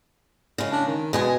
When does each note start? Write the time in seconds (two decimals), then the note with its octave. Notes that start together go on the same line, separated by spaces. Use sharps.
0.58 C#3 G#3
0.72 D4
0.87 D#3
1.13 B2 G#3 D#5 G#5